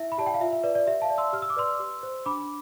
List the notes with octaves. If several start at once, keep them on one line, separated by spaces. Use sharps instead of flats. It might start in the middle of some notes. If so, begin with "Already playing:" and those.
Already playing: E4 E5
B5
G4 D5 A5
G5
F5
F4 E5
E5
B4 D5
D5
G4 E5
F5 A5
D5
C6 E6
G4 F6
E6
D6
B4 D5 C6 E6
G4
C5
D4 B5 D6